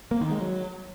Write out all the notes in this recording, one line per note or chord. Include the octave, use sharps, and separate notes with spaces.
A#3
D#3
G#3
F#3